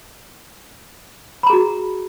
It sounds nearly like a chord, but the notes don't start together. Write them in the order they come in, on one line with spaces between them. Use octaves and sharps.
B5 A#5 G#4 F#4